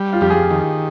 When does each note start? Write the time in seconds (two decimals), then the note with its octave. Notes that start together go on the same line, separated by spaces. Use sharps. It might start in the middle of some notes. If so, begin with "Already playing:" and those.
Already playing: G3
0.13 F4
0.21 F2 G4
0.30 G#4
0.51 D#3